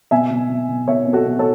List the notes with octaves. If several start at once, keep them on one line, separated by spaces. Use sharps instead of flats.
B2 E5 G#5
B2
B2
B2
B2 C#5 E5
B2
F#4 A4
B2
A4 C#5